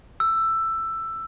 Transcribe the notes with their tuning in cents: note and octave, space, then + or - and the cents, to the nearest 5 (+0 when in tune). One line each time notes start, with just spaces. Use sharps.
E6 +10